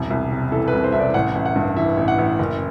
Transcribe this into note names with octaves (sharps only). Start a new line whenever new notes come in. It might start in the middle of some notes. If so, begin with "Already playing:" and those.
Already playing: E1 C2
C2
C3
E3 A4
B4
C2
C5
C2 E5
D5
A1 F#5
A1
F#5
G2
E3 E5
A1
F#5
A1
F#1